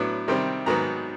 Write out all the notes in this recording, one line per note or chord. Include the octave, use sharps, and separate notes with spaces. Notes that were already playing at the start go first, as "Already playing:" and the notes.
Already playing: A2 F#3 B3 D4
C3 D#3 G3 C4
G#2 D#3 F#3 B3 A#5